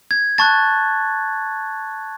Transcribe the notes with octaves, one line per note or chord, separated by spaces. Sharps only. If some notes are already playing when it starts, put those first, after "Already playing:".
G#6
A5 C#6 F#6 A6